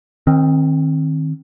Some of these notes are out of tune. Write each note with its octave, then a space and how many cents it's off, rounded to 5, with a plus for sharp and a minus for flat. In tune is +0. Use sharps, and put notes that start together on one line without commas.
D#3 +0 C4 +30